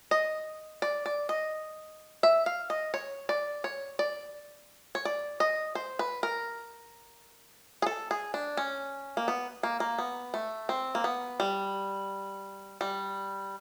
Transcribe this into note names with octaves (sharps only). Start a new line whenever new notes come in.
D#5
D5
D5
D#5
E5
F5
D#5
C#5
D5
C#5
D5
C#5
D5
D#5
C5
B4
A#4
G#4
A4
G#4
D4
C#4
A#3
B3
A#3
A#3
B3
A3
C4
A#3
B3
G3
G3